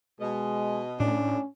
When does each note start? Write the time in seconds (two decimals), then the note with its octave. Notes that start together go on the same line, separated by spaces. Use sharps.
0.21 B2 G#3 D#5
1.00 A2 C#4 D4